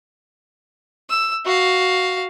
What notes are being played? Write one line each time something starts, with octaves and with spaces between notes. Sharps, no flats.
E6
F#4 F5